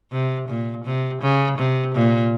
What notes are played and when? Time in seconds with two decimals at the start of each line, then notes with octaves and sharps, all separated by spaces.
0.12 C3
0.49 A#2
0.85 C3
1.22 C#3
1.58 C3
1.95 A#2